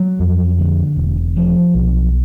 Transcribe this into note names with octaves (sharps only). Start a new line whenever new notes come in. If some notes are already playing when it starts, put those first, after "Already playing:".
Already playing: F#3
F2
D3
E1
F3
B1